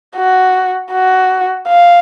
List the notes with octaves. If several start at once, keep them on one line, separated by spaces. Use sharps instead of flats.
F#4
F#4
F5